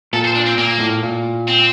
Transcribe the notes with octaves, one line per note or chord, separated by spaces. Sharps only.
A#2 A4
C5
D4
C4
A#2 A#3
A2
A#2
C4